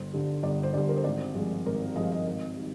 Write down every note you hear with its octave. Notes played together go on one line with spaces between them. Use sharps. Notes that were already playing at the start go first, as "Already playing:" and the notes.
Already playing: G1 C5
G2 D3 G3
G1 D5
C5
G2 D3 G3 D5
A#4
C5
G#1 D5
G2 F3 G#3
G#1 A#4
G2 F3 G#3 D#5
F5
D#5
G#1
D#3 G3